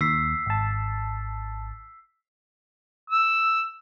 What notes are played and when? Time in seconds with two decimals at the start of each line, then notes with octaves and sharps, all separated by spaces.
0.01 D#2 E6 B6 C7
0.46 G#1 A5
3.10 E6